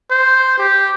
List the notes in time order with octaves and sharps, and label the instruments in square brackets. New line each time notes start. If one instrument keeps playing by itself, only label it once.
[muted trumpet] C5
G4